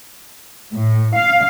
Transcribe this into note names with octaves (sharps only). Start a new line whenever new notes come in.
A2
F5